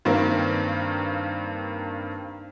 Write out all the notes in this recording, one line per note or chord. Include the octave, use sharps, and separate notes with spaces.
G2 D#3 A#3 C4